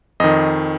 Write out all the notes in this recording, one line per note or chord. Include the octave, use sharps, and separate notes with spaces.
F2 D#3 D#5